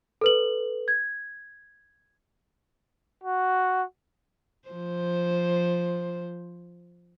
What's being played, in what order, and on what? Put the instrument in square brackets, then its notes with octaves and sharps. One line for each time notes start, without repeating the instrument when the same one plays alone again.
[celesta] A4 B4 F#7
G#6
[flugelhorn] F#4
[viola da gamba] F3 C5